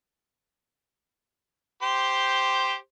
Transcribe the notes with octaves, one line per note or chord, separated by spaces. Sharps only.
G4 C5